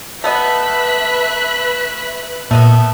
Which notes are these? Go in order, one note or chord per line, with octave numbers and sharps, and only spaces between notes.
A3 B3 B4 D#5 E5 F#6 B6
A#2 A3 B3 D#5 E5